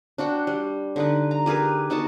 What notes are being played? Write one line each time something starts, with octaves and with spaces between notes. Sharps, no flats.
D4 F#4 F#5 G5
G3
D3 D#4 B4
A#5
G4 G#4 A#4 B4
B3 D#4 F#4 A5